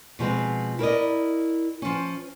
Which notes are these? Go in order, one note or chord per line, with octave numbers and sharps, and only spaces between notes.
B2 F3 G#3 C4
E4 A#4 D5 D#5
F3 C#4